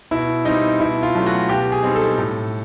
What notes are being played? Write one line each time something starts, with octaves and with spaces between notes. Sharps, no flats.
B2 E4
G3 C4 D#4
B2 E4
F4
F#3 A3 C#4
F#4
B2 G4
G#4
G3 C4 D#4
A4
A2